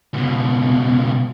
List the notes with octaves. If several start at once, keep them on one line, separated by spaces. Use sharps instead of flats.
C#2 B2